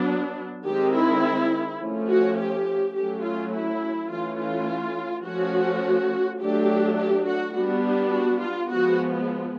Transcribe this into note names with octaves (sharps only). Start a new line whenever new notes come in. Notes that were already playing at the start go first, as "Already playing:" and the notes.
Already playing: F#3 B3 D4
D#3 G#3 C4 G4
E4
F3 A3 C#4
F#4
G4
F#3 A3 C#4 G4
F4
E4
E3 A3 C#4 F4
F4
F3 A3 C#4 F#4
F#3 A3 D4 G4
G4
F#4
G3 B3 D4 F#4
G4
F#4
F4
F3 G#3 B3 F#4